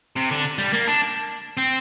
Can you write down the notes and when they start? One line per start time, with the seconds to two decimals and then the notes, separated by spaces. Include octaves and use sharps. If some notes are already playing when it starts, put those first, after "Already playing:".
0.16 C3
0.31 D3
0.58 G3
0.73 A#3
0.87 D4
1.57 C4